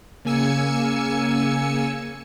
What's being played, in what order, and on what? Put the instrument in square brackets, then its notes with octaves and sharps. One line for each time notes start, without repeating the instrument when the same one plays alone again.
[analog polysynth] C#3 A#3 G#5 E6 C#7